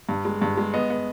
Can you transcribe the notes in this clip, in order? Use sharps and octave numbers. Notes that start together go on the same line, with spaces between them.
G2
G#3
G2
G#3
B3 D#5
B3